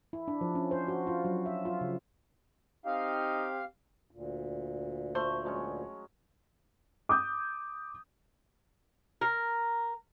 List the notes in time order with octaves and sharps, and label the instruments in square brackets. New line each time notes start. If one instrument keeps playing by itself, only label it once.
[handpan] E4
D4
F3
C#4
C5
F#4
F4
F#3
E5
F4
C#3
[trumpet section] C4 G4 [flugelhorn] D#4 [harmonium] F5
[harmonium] D2 A#2
[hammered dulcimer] A3 [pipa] C5
[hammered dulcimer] F#3 G#3 C#4
[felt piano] D6 D#6 G6
[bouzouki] A#4